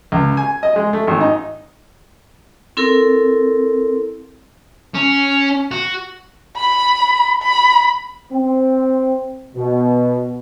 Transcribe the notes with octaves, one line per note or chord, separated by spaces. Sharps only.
C#2
G#5
D#5
G#3
A3
G#1
D#4
C4 E4 A4 A#4
C#4
F#4
B5
B5
C4
B2